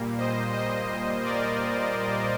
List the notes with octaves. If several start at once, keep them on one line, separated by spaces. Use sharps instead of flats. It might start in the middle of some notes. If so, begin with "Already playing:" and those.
Already playing: A#2 G3 A#3
C5 D#5
C5 D#5
A#4 D5